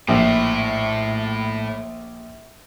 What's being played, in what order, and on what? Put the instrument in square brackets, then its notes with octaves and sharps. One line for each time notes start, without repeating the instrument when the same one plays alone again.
[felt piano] A#1 [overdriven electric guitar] A2